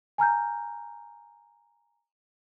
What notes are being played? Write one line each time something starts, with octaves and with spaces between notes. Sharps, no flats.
G#5 A#5 F6 G6